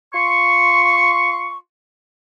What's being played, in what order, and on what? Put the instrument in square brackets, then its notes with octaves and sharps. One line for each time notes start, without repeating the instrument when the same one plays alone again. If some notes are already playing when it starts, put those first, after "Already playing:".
[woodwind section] F4 C6 C#6